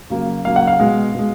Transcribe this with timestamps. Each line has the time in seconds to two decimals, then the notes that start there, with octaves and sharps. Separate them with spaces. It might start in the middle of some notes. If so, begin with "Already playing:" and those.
0.10 C#3 F#3 A#3
0.45 C#3 F#3 A#3 F5
0.56 F#5
0.67 F5
0.79 B2 G#3
1.15 B2 G#3